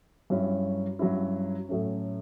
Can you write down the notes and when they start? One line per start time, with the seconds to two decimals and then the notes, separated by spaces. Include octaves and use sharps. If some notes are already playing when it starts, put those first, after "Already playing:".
0.30 G2 F#3 C#4 E4
0.99 G2 F#3 C#4 E4
1.68 A2 F#3 A3 C#4